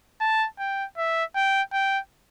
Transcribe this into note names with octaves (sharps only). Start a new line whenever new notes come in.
A5
G5
E5
G5
G5